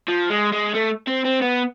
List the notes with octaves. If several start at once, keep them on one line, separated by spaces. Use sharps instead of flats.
F3
G#3
G#3
A3
C4
C4
B3